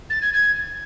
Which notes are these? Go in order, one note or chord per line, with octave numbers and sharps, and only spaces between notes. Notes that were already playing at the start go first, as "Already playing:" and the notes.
A6
G#6
G#6